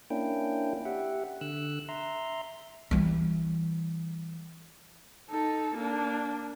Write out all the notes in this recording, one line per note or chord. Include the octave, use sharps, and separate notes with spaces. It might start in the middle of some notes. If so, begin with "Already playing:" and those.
A#3 C#4 D4 E4 G5
G4 E5 F#5
D3 E6 F#6
E5 A#5 C6
E3 G3
D#4 A4
A#3 D4